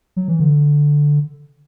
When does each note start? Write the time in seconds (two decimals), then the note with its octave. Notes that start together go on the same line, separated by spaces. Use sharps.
0.16 F#3
0.28 E3
0.40 D3